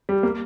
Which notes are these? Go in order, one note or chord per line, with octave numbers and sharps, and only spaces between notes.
G3
A#3